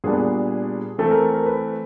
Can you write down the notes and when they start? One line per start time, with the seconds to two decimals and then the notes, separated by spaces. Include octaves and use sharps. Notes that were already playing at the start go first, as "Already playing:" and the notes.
0.04 A#2 G3 B3 D4 G#4
0.98 E3 A3 C4 A4
1.11 A#4
1.34 A#4
1.46 B4